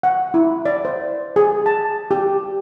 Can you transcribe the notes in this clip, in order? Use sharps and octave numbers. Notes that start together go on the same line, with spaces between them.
F#5
E4
D5
C5
G#4
A5
G4